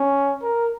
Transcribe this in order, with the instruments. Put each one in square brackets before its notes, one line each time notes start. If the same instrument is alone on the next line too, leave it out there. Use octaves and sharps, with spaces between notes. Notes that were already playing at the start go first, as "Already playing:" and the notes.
Already playing: [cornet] C#4
A#4